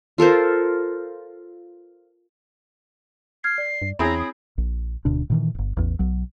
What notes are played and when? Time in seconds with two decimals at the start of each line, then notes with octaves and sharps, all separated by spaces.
0.18 F4 A4 A#4 C5
3.44 F6 G#6 C7
3.58 D5
3.82 G2
3.99 E2 C4 E4 G#4 C#5 A#5 B5
4.19 D#6
4.58 A#1
5.05 D1 D2 B2 D4
5.30 A#2 D#3 E3
5.55 D1 G1
5.77 A1 E2
5.99 B1 F#3